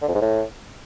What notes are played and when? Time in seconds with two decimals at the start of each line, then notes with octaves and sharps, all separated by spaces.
0.02 D3
0.08 F2
0.15 G#2
0.21 A2